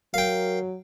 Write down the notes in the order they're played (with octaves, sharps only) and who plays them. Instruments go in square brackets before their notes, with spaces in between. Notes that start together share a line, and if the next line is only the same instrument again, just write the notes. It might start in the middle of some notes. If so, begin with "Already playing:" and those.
[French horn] F#3 [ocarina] A#4 [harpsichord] F5 G5